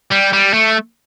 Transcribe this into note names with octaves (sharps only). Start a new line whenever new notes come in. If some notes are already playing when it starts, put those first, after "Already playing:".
G3
G3
A3